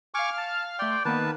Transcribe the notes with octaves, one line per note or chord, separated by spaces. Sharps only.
F5 G#5 C#6 D6 F6
A5
A3 D5 G5 C6
D#3 A#3 B3 B4 A5